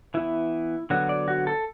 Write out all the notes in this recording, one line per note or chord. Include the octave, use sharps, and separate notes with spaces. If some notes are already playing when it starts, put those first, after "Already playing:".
E3 B3 E4
D3 F#3 B3 F#4
D5
F#4
A4